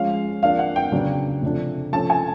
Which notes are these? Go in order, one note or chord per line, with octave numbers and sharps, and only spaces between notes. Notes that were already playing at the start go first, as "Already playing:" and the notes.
Already playing: F3 G#3 C#4 F5
F3 A#3 D4 F5
F#5
G5
C#3 F#3 B3 D4
C3 F3 A3 D4
F3 A3 C#4 A5
G#5